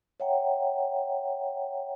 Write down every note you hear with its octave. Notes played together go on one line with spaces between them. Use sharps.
C#5 E5 F#5 G5 A#5